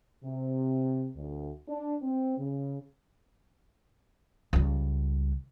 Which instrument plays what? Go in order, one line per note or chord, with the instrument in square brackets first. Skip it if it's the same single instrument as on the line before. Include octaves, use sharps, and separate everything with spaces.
[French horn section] C3
D2
D4
C4
C#3
[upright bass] C#2 G3